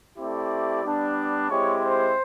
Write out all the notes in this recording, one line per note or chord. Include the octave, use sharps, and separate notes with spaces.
A3 C4 E4 G4 D5
G3 B3 D4
D5
G#3 C4 E4 G4 C#5
C5